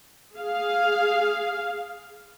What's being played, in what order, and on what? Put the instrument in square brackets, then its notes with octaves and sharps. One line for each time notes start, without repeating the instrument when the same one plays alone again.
[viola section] G#4 F5